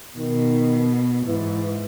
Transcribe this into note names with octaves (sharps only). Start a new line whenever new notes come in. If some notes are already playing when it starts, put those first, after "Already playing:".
B2 D#3
G#2 E3